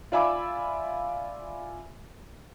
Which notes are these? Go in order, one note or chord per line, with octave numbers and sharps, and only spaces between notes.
F4 D5 E5 G#5 B5 D6